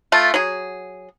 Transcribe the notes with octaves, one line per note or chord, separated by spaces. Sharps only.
A3 F4 A5
F#3 G#4